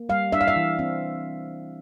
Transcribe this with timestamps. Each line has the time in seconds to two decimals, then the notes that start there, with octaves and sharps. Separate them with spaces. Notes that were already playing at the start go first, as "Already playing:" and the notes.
Already playing: A#3
0.09 G3 F5
0.32 D4 E5
0.41 F5
0.48 E5
0.56 E3
0.79 C4